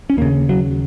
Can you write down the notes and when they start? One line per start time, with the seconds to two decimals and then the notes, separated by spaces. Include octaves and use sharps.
0.10 C#4
0.17 D#2 C#3 A#3
0.49 F#3